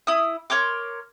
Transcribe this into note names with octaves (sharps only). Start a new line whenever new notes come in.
E4 D#6
A#4 C#5 C6 D6